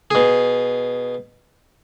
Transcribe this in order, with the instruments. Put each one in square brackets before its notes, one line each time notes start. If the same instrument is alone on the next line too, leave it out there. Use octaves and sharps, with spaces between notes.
[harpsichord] B2 G#4